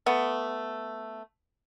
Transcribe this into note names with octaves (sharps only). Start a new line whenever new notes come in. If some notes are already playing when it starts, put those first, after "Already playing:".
A3 B3